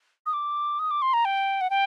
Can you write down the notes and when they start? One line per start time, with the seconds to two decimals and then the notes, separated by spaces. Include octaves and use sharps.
0.26 D#6
0.33 D6
0.79 D#6
0.91 D6
1.02 C6
1.13 A#5
1.25 G5
1.61 F#5
1.70 G5